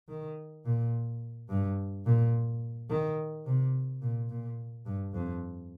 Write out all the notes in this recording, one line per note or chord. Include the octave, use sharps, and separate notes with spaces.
D#3
A#2
G2
A#2
D#3
C3
A#2
A#2
G2
F2